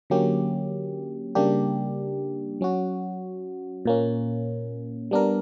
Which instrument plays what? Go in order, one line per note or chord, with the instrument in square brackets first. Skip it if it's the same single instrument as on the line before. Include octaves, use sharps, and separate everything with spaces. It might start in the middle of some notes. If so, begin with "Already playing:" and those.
[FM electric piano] D3 F#3 A#3 C#4 G4
C#3 G3 A#3 D4 G4
F#3 C#4 F#4
A#2 A#3 C#4
G3 B3 D4 A#4